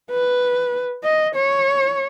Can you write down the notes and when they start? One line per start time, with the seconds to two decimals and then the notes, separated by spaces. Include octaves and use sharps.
0.11 B4
1.04 D#5
1.35 C#5